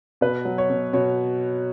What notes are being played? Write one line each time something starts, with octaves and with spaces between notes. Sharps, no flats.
B2 B4
F#3
C#5
B2
B2 C#5